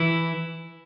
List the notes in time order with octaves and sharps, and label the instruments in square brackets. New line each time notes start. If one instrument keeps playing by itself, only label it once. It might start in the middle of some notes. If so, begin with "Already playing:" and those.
Already playing: [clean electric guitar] E3 E4